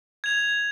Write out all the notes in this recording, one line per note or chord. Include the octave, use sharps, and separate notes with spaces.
G#6 F7